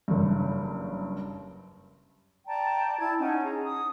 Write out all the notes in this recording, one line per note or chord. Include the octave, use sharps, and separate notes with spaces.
F#1 G2
D5 G5 A5 A#5
E4 A5 G#6
C#4 D#4 F#5 G#5
G#4 A#5
D#6